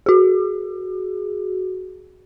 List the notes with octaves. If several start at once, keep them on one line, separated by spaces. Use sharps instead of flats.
F#4 G#4